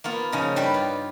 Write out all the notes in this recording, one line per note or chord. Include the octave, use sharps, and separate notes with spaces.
A#3 B3 F4
C#3 F3 D#4
G2 G3 G4 B4 G5
F4